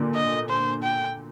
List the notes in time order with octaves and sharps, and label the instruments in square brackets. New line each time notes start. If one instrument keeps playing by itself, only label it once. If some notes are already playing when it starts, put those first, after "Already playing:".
Already playing: [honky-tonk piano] A#2 D3
[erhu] D#5
C5
G5